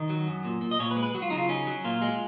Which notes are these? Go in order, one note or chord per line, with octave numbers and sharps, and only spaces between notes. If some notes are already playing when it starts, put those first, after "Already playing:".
Already playing: D#3 D#5
F#3
F#2
A#2
A#2
D#5
A#2 C#5
B4
G#3
B4
F#3 F#4
F4
C#3 D#4
F4
C#4 D#4
F#3
A#2 F4
G#3